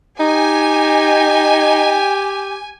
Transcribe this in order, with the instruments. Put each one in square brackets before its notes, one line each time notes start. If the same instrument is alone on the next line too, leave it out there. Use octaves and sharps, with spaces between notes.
[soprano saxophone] D#4 [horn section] G4 [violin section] G#5